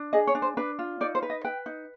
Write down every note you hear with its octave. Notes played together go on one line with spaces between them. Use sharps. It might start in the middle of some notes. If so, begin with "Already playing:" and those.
Already playing: D4
G#4 D#5
C#5
D4
C5
D4 B4
F4
D#4 D5
C5
B4
D#5
B4 G5
D#4